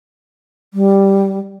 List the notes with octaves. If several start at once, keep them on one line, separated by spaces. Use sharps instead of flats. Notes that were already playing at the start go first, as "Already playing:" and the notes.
G3